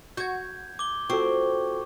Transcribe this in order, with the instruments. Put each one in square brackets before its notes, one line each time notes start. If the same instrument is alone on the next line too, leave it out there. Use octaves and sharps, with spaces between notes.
[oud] F#4 [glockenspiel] G6 G#6
[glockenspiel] D6 G7
[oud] C4 [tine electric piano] F4 F#4 A4 [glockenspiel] C#6